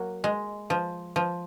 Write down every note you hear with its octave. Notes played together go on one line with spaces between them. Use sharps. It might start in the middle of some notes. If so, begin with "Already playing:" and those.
Already playing: F#3 A#3
G#3
F3
F3